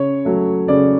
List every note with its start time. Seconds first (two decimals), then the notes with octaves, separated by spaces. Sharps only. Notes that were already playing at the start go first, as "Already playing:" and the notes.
Already playing: C#3 C#5
0.25 F#3 A3
0.68 C#3 D5